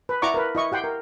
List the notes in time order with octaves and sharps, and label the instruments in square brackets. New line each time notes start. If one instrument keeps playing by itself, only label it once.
[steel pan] B4
E4 D5 F#5 A#5 C#6 D6
A#4 B4
E4 D#5 C#6
G4 F#5 G5 C6
A#4